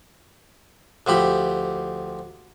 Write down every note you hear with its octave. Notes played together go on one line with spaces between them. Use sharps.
D2 F3 G4 B5